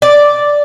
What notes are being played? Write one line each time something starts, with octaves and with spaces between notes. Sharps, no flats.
D5